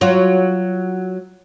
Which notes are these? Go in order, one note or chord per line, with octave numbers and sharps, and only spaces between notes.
F#3 F4